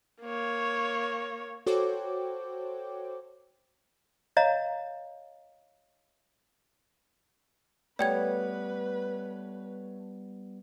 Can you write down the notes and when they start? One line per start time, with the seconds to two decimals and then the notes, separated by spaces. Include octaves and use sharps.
0.22 A#3 C#5
1.67 F#4 A4 C5 C#5 G5 D6
4.37 C#5 D#5 F5 A#5
7.99 G3 A3 B3 B4 C#5 D5 G5 G#6